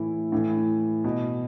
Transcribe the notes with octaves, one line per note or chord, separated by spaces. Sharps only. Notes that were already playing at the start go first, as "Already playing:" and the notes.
Already playing: A2 E3 E4
A2 E3
B2